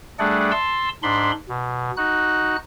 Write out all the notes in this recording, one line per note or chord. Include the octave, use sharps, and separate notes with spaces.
G3 A3 D4 G#4 D5 F#5
A5 C6 E6
G#2 D4 B5 C6
B2
D#4 F#4 F#6